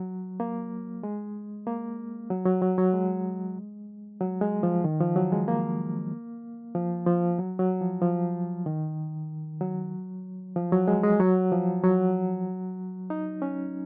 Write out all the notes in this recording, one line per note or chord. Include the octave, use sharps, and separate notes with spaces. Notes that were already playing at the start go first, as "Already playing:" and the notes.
Already playing: F#3
A#3
G#3
A#3
F#3
F#3
F#3
F#3
G#3
F#3
G#3
F3
D#3
F3
F#3
G#3
A#3
F3
F3
F#3
F#3
F3
F3
D#3
F#3
F3
F#3
G#3
G#3
F#3
F3
F#3
D#4
C#4